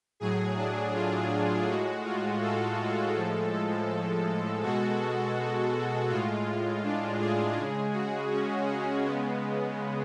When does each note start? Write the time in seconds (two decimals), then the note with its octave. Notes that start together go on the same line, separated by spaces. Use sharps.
0.20 A2 F#3 G#4
0.57 D4
0.94 F4
1.67 A2 G#3 F#4
2.04 F4
2.41 A4
3.15 A2 F3 G#3
4.63 B2 G#3 F#4
6.09 A2 G#3 F4
6.84 D4
7.19 G#4
7.56 C#3 G#3 G#4
7.93 F#4
8.31 C#4
8.67 C#4
9.04 C#3 G#3 B3